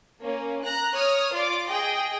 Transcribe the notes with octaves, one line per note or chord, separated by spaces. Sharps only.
A#3 C#4
A#5 F#6
C#5 D#6 F6
F4 D5 D6
G#4 D#5 G5